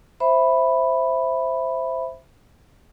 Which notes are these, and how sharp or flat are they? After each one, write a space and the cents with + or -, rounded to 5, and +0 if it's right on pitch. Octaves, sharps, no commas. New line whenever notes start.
C5 +0 E5 +5 B5 +0